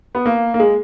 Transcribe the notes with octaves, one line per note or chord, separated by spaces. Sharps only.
B3
A#3
A#3
G#3